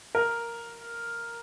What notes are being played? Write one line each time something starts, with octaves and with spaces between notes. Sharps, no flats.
A#4